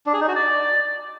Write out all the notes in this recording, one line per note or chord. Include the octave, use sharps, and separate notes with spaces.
D4
G#4
D#4
F#4
D5